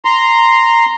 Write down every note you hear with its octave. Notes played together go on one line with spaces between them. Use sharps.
A#5 C6